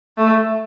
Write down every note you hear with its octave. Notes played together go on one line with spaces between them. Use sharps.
A3